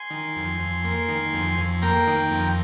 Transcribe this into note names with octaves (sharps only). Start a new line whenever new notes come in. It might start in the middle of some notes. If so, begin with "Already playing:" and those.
Already playing: G#5 C6
D#3
F2
F2
A#3
D#3
F2
F2
A#3 G5 A#5
D#3
F2